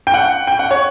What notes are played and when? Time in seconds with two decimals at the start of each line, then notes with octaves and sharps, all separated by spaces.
0.07 G5
0.14 F#5
0.47 G5
0.59 F#5
0.71 C#5